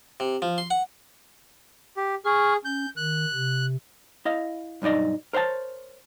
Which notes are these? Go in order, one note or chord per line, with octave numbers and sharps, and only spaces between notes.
C3
F3
C6
F#5
G4
G#4 C#6 F6
C#4 G6
D#3 F#6
C3
E4 D#5 F5
B1 G2 D#4 D5 D#5
A#4 C5 C#5 F#5 A5